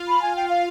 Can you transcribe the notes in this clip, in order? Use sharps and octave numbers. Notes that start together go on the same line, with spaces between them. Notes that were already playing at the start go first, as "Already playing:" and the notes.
Already playing: F4 F5
B5
G#5
G5
F5